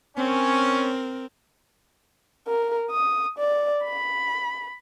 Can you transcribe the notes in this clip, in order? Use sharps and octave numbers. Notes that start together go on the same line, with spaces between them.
C4 C#4 A#4
A#4
D#6
D5
B5